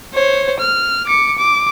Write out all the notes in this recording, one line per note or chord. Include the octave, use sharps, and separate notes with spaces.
C5 C#5
F6
D6 C#7
D6